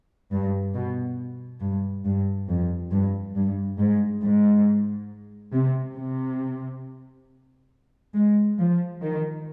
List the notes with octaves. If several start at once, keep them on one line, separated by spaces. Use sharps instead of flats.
G2
B2
G2
G2
F2
G2
G2
G#2
G#2
C3
C3
G#3
F3
D#3